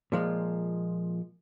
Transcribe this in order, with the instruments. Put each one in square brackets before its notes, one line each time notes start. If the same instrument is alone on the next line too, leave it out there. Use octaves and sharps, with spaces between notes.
[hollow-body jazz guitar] A#2 F3 G#3